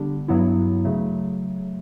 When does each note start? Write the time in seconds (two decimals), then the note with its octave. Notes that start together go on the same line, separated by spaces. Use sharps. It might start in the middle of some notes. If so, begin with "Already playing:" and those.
Already playing: D3 G3 B3 D4 G4
0.28 G2 F#3 B3 E4
0.85 C#3 F#3 A3